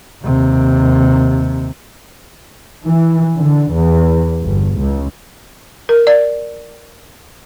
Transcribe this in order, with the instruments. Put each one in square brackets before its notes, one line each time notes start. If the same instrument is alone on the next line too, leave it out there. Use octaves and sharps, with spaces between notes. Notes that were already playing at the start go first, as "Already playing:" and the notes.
[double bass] D#2 C3
[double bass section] E3
D3
E2
G1
C#2
[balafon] A#4
D5